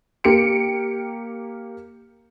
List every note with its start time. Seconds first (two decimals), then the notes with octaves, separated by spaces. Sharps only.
0.24 A#3 G4 C#7 D7